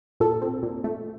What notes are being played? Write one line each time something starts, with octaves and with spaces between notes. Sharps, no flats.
A#2 A4
C4
A#2
A3